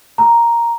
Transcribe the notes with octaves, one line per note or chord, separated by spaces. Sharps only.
A#5